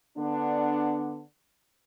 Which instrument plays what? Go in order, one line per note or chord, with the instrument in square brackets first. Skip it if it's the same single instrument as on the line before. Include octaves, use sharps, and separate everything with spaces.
[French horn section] D3 B3 D4